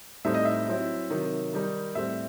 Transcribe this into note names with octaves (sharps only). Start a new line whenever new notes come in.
A2 G3 C4 D#4 E5
D#5
E5
F#3 C4 E4
C3 D#3 F#3
D#3 G3 D#4
A2 G3 C4 E5